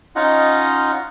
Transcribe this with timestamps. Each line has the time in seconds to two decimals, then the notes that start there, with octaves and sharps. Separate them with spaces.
0.16 C#4 D#4 F4 D#5 F#5